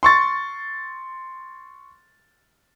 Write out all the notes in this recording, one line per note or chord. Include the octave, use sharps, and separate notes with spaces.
C6 C#6 A6